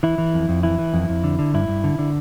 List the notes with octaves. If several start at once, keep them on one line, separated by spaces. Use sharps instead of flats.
E3 E4
E3
F2
F2
E3 E4
E3
F2
F2
D3
D3
G2 E4
G2
D3
D3